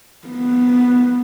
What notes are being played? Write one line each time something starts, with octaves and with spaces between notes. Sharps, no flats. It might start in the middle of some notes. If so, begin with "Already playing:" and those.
B3